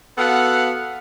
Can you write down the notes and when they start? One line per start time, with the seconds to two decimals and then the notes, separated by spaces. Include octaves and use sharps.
0.18 B3 F#4 A4 F5 F#5